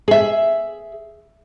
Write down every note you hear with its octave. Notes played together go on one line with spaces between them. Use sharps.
G#4 E5